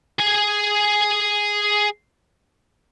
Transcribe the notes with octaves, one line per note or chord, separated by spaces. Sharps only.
G#4 G#5